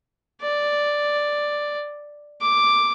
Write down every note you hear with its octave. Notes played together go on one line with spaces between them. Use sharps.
D5
D6